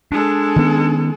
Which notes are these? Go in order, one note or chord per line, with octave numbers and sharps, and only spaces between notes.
G#3 D4 A4
D#3 B3 C#4